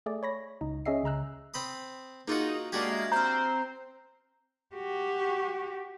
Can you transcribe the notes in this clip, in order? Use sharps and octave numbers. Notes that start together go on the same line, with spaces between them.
A3 G#4 D5
C#5 B5 A#6
C#2 D#4
C#4 G#4 D#5 E5 C7
C#2 C#3 A#5 E6 F#6
C4 B5 D#6
A#3 D#4 F4 F#4 G#4 D#5 C#7
G#3 A#3 D4 F#4 G4 G#6 C7
E5 G#6 A#6
C4 C5 A#5 F6 G6
F#4 G4